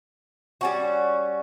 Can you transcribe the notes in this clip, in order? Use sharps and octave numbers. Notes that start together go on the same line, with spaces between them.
G3 C#4 F#4